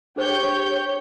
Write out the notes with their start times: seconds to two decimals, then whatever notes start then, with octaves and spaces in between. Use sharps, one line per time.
0.16 D4 G4 G#4 C5 C#5 G6